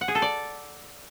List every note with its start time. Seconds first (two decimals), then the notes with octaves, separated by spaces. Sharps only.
0.01 F#5
0.08 G#4
0.15 A4
0.22 D5